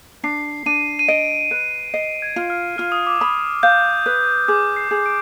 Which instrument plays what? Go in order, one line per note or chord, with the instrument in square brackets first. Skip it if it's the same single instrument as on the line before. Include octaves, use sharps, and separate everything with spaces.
[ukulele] D4 [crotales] C7
[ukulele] D4 [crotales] D#7
[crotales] D#7
[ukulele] D#5 [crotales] D7
[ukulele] B4
[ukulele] D#5 [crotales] C7
[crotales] G#6
[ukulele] F4
[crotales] F6
[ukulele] F4 [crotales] F6
[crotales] D#6
D6
[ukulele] B5 [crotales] D#6
[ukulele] F5 [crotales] G6
[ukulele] B4
[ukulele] G#4 [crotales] D6
[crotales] C7
[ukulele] G#4
[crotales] D7